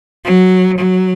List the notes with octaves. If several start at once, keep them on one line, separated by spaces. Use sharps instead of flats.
F#3
F#3